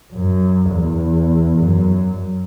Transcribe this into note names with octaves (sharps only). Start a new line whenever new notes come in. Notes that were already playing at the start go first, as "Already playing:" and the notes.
F#2
E2
F#2